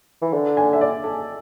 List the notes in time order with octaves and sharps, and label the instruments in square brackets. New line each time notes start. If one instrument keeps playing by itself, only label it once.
[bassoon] E3
D3
[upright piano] G#5
E5
D5
A4